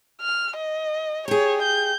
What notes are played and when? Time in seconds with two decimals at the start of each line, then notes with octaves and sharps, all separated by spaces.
0.22 F6
0.56 D#5
1.28 G4 G#4 C#5
1.63 G6